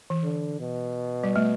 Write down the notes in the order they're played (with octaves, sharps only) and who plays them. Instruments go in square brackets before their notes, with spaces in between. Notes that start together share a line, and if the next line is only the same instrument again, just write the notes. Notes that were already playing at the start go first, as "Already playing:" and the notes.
[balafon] E3
[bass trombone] D3
B2
[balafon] G3
A3